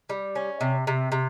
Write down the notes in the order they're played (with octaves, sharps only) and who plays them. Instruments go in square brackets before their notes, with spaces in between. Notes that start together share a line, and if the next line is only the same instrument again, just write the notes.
[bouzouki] G3
C#4
C3
C3
C3